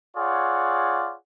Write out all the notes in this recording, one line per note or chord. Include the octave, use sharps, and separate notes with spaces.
F4 G#4 C#5 D5 F#5